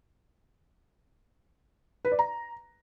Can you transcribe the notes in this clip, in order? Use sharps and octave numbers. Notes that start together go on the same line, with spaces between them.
B4
D5
A#5